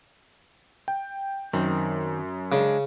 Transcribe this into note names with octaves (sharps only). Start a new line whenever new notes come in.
G5
F#2 D#3 C4
C#3 G#3 D4